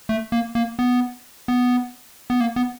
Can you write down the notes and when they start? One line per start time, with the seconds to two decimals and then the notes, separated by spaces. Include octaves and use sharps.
0.09 A3
0.32 A#3
0.55 A#3
0.79 B3
1.48 B3
2.30 B3
2.41 A#3
2.56 B3